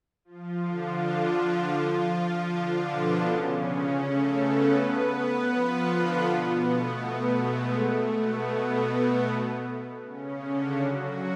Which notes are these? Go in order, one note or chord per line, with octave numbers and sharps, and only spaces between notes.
F3 F4
D3 D4
F3 F4
F3 F4
D3 D4
B2 B3
C#3 C#4
A3 A4
B3 B4
B3 B4
B3 B4
F3 F4
D3 D4
B2 B3
A3
A3
G#3
A3
B2 B3
C#3 C#4
D3 D4
F#3 F#4